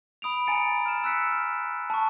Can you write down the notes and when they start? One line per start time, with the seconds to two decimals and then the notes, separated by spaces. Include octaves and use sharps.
0.22 B5 D#6 D7 F7
0.47 G#5 A#5 A6 C#7 D7
0.86 F6 E7
1.04 E6 F#6 B6 C#7 E7
1.31 F6
1.90 A5 C#6